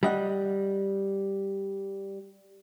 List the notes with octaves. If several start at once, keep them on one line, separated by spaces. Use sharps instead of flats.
G3 D#5 F#5